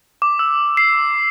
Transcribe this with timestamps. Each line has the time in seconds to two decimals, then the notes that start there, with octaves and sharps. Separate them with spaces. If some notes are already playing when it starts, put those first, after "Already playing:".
0.22 D6
0.39 E6
0.77 C7